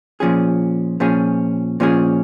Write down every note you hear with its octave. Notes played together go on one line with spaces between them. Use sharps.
A#2 F3 C#4 G#4
A#2 F3 C#4 G#4
A#2 F3 C#4 G#4